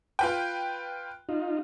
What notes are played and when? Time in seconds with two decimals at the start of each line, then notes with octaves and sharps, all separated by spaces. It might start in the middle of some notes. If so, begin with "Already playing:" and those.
0.19 F4 B4 G5
1.29 D#4 F4